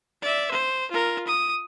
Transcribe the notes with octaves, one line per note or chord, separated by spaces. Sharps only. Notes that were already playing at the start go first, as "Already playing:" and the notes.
D5 E5
C5
F4 A#4
D#6